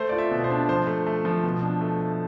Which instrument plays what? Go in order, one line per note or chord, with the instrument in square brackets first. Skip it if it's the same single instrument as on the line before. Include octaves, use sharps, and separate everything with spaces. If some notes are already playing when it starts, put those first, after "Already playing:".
Already playing: [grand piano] A3 C5
F4 D5
E5
B2
C5
D4
F3 C5
A3
A3
F3
B2
D4
A3
A3